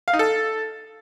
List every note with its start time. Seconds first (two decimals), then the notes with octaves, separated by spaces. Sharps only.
0.08 F5
0.13 D#4
0.19 A4